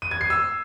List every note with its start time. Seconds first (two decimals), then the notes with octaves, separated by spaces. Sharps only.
0.02 D#7
0.11 G#6
0.21 C7
0.30 E6